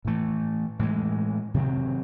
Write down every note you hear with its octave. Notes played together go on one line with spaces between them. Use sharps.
A2 E3 A3
A2 E3 G#3
C3 D#3 F#3 C4